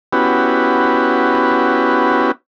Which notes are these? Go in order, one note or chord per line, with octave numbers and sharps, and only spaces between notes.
B3 C#4 E4 F#4 G4 B4